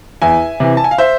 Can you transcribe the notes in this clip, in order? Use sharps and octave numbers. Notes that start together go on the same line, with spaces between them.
E2 E5 G#5
C3 E3
A5
G#5
F5
C5 E5